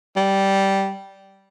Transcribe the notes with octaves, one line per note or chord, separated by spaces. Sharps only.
G3